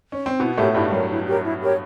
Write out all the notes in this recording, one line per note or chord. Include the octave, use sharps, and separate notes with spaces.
C#4
C4
B2 B3 E4
A2 A3 G4 A#4 C#5
G2 G3 E4
F#3 G4 A#4 C#5
E4
G4 A#4 C#5
E4
G4 A#4 C#5